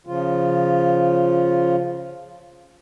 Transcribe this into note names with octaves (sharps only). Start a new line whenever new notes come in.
C#3 F3 F4